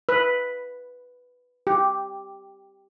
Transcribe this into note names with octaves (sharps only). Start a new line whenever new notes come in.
B4
G4